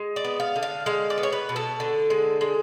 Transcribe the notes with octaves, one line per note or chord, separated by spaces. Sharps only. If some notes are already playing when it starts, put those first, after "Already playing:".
Already playing: G#3
D5
B3
F5
D3
F5
G#3 F5
D5
B3
C#5
B4
B2
A4
D3
G#3
G#3